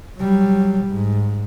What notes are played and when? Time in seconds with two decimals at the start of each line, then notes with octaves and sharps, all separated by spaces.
0.18 F#3 G3
0.87 G#2